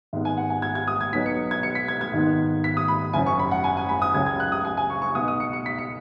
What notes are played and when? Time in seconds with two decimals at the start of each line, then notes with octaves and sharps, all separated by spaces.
0.13 G#1 G#2 G#3 B3
0.25 G#5
0.37 F#5
0.50 G#5
0.62 G#6
0.75 G#6
0.88 D#6
1.01 G#6
1.13 B1 B2 F#3 B3 B6
1.26 C#7
1.51 G#6
1.63 C#7
1.75 B6
1.88 G#6
2.01 G#6
2.13 G#1 G#2 D#3 B3
2.64 B6
2.77 D#6
2.88 B5
3.13 F#1 G#5
3.17 F#2 F#3
3.27 C#6
3.39 B5
3.51 F#5
3.64 G#5
3.77 G#5
3.89 B5
4.02 D#6
4.14 C#2 C#3 F#3 C#4 G#6
4.26 G#6
4.40 F#6
4.52 D#6
4.65 G#5
4.77 G#5
4.90 C#6
5.02 C#6
5.15 B1 B2 B3 D#6
5.28 D#6
5.40 C#7
5.53 C#7
5.66 B6
5.78 C#7